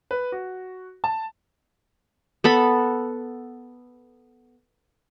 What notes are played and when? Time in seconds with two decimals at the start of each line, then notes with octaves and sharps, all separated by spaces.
0.11 B4
0.32 F#4
1.04 A5
2.44 B3 A4 B5